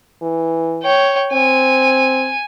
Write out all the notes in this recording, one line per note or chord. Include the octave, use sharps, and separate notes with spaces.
E3
C#5 G5
C4 G#5